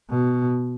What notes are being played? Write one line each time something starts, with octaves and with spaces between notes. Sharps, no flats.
B2